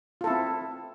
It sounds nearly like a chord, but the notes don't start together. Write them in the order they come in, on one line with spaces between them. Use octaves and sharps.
F4 A4 E4 C4